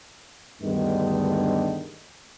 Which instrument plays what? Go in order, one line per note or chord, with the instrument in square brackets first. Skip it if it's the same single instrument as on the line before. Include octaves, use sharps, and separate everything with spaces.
[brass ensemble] D2 G2 D3 D#3 G#3 B3